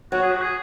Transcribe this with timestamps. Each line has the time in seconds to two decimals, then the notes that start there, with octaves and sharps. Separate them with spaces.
0.12 F#3 F#4
0.22 G#4
0.32 F#4
0.42 G#4